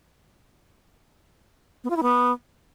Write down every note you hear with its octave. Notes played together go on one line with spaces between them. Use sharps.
B3
F4
E4
B3